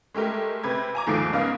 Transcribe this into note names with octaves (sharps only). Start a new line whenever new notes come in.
G#3 A3 G4 A#4
C3 B4 G#6
G#5 A#5 D6
D#2 G#2 F3 A4 C7 D7
G#2 C#3 G#3 B3 A#4 F5